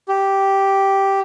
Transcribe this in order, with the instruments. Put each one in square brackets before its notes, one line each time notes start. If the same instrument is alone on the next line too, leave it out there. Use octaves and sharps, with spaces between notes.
[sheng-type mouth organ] G4